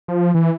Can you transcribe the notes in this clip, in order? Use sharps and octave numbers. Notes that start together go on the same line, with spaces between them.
F3
E3